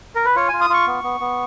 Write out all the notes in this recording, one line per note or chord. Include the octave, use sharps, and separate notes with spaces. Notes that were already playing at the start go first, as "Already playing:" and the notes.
A#4
B4
F4 C#5
F4 G#5
D#6
F4 C#6
B3
B3
B3